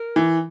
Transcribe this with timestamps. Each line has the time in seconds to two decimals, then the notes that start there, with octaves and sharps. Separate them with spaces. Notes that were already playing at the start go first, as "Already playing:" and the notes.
Already playing: A#4
0.16 E3